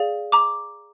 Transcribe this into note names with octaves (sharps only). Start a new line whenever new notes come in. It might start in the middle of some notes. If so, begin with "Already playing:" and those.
Already playing: G#4 D5 F5
A#5 D6